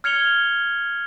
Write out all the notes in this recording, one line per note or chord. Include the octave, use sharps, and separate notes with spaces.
F6 G#6 C#7 F7 G7